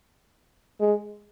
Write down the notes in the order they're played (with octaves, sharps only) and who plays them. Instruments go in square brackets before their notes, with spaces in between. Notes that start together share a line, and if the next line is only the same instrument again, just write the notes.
[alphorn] G#3